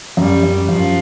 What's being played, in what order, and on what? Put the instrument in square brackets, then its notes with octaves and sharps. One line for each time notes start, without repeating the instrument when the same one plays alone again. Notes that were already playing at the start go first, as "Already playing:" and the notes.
[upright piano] F#2 [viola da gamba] G3
[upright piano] F#2
[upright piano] F#2 [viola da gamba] F3